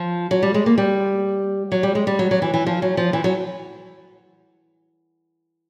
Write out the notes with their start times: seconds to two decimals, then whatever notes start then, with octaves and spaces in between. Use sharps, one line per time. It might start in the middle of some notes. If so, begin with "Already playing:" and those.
Already playing: F3
0.31 F#3
0.43 G3
0.54 G#3
0.66 A#3
0.78 G3
1.72 F#3
1.83 G3
1.95 G#3
2.07 G3
2.19 F#3
2.31 F#3
2.42 E3
2.54 E3
2.66 F3
2.82 F#3
2.97 F3
3.13 E3
3.24 F#3